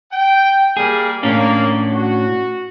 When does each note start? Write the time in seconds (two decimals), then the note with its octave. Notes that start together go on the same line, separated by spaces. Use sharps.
0.12 G5
0.77 G3 A#3 G#4
1.23 A2 A#3 C#4 D4
1.92 F#4